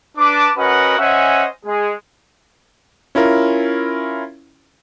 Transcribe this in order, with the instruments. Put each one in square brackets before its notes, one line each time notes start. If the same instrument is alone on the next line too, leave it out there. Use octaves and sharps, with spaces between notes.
[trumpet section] D4 B4 A5 D6
C#4 F#4 A#4 B4 D#5 F#5
C#4 C5 D#5 E5 F#5 G#5
G#3 G#4
[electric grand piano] C#4 E4 F4 A#4